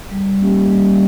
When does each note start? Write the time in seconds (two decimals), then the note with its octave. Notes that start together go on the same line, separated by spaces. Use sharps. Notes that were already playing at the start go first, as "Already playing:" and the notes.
0.11 G3
0.40 A#3 C#4 G4
0.71 G3